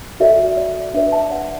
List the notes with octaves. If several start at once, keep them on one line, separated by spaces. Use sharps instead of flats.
F#4 A4 D5 E5
D5
D4 B4 D5 E5
E5 A5
D5 F#5